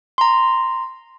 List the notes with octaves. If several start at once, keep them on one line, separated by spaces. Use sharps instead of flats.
A#5 C6